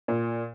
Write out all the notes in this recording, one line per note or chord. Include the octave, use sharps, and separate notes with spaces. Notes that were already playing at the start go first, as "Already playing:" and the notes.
A#2